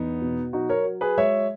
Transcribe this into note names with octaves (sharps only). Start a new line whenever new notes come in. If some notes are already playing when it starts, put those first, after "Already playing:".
Already playing: E2 B3 D#4
B2
F#3 D#4 F#4
A#4 C#5
F#3
G#4 B4
G#3 C#5 E5